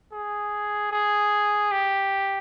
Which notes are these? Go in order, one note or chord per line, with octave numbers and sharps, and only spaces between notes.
G#4
G#4
G4